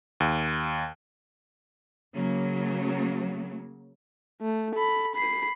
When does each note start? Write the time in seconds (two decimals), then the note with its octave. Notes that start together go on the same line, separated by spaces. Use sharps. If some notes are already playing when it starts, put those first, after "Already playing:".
0.20 D#2
2.13 C#3 F#3 A#3
4.41 A3
4.75 A4 B5
5.16 B5 C7